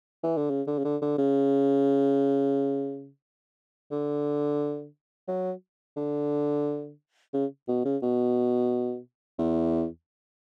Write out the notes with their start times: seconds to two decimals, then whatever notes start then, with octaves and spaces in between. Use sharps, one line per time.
0.23 E3
0.37 D3
0.50 C#3
0.67 D3
0.78 C#3
0.85 D3
1.01 D3
1.18 C#3
3.91 D3
5.28 F#3
5.97 D3
7.33 C#3
7.68 B2
7.85 C#3
8.02 B2
9.38 E2